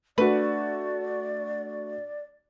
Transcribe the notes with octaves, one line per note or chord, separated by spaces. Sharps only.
A3 D4 F#4 B4 D5